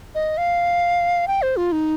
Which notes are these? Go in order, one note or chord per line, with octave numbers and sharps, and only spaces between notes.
D#5
F5
G5
C5
F4
D#4